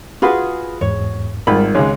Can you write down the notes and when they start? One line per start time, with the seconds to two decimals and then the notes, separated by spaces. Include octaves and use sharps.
0.22 F4 F#4 G#4 B4 B5
0.81 E2 G#2 C#5
1.47 G#1 G3 F4 A#4 B5
1.75 G#1 C#2 G#3 C#5